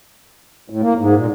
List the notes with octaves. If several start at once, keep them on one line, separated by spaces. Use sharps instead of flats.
A2
A#3
G#2
A#2